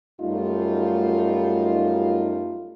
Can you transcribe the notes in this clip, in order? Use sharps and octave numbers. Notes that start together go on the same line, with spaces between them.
F#2 G3 A3 D#4 F4